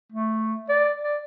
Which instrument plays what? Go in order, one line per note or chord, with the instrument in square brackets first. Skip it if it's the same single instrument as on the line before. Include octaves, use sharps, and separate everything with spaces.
[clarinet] A3
D5
D5